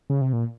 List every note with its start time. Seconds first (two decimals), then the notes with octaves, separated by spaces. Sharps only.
0.10 C#3
0.21 C3
0.33 A#2